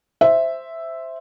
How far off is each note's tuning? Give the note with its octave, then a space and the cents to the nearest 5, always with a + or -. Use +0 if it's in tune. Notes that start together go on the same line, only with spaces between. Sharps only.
C5 +0 E5 +0